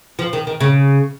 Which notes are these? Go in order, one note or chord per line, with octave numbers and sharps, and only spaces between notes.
F3
D#3
D#3
C#3